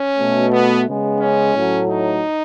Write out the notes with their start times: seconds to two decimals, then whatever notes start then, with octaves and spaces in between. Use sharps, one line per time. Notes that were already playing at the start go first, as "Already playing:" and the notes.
Already playing: C#4
0.19 B2 A3
0.52 B3
0.86 C#3 G#3 B3
1.20 C#4
1.54 A2 F#3 A3
1.88 D#4